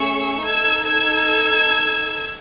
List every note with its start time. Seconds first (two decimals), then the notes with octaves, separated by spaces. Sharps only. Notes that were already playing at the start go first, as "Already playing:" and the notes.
Already playing: A3 C#4 G#4 C#6 E6
0.45 D#4 A4 E6 G#6
0.88 E6 G#6